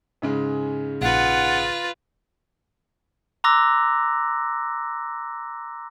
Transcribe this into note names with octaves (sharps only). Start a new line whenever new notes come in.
G#2 C#3 G#3
A#1 F4 B4 F#5
A#5 C6 D6 E6 F#6 A#6